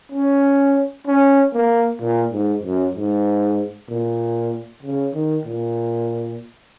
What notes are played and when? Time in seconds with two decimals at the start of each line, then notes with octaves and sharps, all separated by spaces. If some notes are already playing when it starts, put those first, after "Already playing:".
0.12 C#4
1.07 C#4
1.54 A#3
2.01 A#2
2.31 G#2
2.63 F#2
2.95 G#2
3.89 A#2
4.83 C#3
5.14 D#3
5.46 A#2